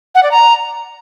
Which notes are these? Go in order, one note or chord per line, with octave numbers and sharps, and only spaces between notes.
F#5
D5
A#5